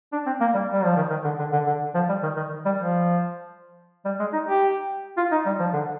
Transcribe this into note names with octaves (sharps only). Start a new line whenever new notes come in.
D4
C4
A#3
G3
G3
F3
D#3
D#3
D3
D3
D3
D3
F3
G3
D#3
D#3
G3
F3
G3
G#3
D#4
G4
F4
D#4
G3
F3
D3